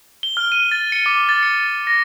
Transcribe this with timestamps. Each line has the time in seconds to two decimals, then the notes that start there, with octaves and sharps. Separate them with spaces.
0.23 G7
0.37 F6
0.52 D#7
0.72 A6
0.92 C#7
1.06 D6
1.29 A6
1.43 C#7
1.87 A#6